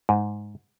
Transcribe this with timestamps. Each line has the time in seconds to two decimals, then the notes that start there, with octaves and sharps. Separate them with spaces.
0.09 G#2